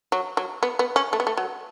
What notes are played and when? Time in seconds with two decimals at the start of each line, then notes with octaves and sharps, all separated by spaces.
0.12 F#3
0.37 F#3
0.63 B3
0.79 B3
0.96 C#4
1.13 A3
1.20 B3
1.27 A3
1.37 F#3